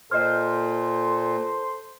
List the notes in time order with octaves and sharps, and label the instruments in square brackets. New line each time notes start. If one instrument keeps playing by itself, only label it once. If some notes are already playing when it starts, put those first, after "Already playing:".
[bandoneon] A#2 [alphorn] A4 [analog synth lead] C5 [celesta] D#5 F6